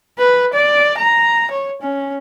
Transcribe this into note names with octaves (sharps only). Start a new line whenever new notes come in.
B4
D5
A#5
C#5
C#4